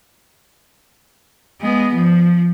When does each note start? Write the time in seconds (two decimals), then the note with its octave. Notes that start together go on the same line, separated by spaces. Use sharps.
1.61 G#3 B3
1.94 F3